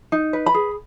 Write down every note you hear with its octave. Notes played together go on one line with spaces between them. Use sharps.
D#4
B4
B5
G#4